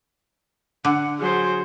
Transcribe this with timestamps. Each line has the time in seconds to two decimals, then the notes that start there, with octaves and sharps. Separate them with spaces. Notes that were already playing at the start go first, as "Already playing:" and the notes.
0.85 D3 F#5
1.19 F#3 G#4 C5